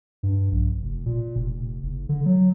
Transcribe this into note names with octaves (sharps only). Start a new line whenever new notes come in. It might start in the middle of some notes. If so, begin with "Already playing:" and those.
G2
A#1
F1
A#2
F1
F#1
D3
F#3